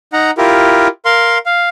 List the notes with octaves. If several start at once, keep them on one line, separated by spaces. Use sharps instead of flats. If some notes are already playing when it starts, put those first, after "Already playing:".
D#4 F#5 A#5
E4 F4 G4 A#4
A#4 F5 C6
F5